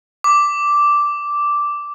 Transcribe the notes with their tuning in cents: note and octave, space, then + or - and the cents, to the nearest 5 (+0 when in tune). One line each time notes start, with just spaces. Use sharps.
D6 -5